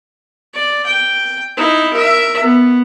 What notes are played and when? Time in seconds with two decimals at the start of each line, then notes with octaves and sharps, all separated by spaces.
0.54 D5
0.86 G5
1.57 D#4 E4
1.94 A#4 E5
2.44 B3